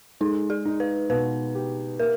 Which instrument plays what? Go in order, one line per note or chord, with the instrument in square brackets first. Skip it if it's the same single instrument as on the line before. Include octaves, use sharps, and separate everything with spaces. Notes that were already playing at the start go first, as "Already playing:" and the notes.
[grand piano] G#3 [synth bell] D#4
[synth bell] G#4
[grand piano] D#4
[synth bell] B4
[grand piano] B2 [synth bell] B4
[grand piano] G4
[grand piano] A#3 [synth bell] A#4